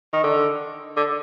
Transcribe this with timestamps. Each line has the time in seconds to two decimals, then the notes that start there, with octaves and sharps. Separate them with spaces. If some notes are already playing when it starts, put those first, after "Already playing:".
0.13 D#3
0.23 D3
0.97 D3